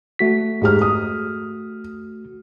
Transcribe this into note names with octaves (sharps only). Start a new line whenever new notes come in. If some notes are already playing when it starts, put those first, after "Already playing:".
A3 F#4 B6
G#2 G4 F6
D#6